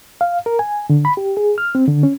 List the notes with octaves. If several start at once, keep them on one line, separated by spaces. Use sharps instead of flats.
F5
A#4
G#5
D3
B5
G4
G#4
F6
C4
D3
C#4